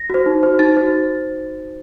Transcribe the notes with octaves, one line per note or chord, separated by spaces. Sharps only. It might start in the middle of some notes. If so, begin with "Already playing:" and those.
Already playing: A#6
F#4 C5
D#4
F#4 C5
D#4 A6
F#4 C5